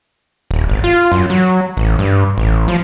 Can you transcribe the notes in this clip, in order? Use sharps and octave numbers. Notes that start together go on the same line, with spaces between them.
D#1
G#1
F4
F#2
F#3
A1
G2
A1
F3